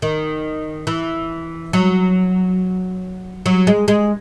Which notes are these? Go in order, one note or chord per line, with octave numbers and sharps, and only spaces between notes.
D#3
E3
F#3
F#3
G#3
G#3